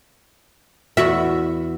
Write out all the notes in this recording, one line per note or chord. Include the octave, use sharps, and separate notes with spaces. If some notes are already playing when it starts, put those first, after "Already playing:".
E2 F#4 E5